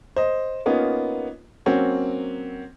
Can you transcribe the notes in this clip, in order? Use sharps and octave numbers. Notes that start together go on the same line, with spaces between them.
C5 D#5
A#3 B3 C#4 D#4 F4
F#3 A#3 C4 C#4 F#4